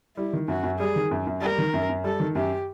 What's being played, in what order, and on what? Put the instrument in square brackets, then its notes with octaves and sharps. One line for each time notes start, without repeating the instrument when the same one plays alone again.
[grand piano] G3 [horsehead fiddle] E4
[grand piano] D#3
[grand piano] F#2 [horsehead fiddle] F#4
[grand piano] F#2
[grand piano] G3 [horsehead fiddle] G#4
[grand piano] D#3
F#2
F#2
[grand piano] G3 [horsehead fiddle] A#4
[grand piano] D#3
F#2
F#2
[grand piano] G3 [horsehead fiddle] A4
[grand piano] D#3
[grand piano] F#2 [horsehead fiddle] G4